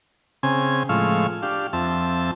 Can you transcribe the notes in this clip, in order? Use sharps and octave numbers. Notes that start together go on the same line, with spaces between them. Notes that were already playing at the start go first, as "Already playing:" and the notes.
C#3 C4 G#5
A2 F3 G#3 F5 C#6 E6
D4 G4 F5
F2 C4 E5 A5